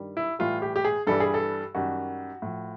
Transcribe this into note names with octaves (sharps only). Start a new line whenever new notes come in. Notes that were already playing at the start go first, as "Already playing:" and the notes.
Already playing: G2 D#3 G3
E4
A2 E3 G3 F4
G4
G4
G#4
G2 E3 G3 A4
G#4
A4
F#2 D#3 G3 F#4
A2 F3